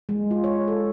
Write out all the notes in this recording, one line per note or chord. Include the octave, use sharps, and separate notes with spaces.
G#3
F4
C#5
A4